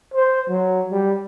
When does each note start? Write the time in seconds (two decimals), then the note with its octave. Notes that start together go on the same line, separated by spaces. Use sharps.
0.14 C5
0.49 F#3
0.91 G3